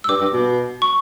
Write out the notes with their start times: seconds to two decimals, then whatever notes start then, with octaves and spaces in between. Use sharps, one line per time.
0.04 E6
0.09 G2 D6
0.20 G2
0.33 B2
0.82 C#6